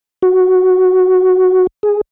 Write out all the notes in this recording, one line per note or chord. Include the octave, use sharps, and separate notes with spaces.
F#4
G#4